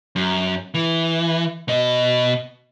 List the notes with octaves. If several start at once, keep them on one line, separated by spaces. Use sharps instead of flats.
F#2
E3
B2 D#5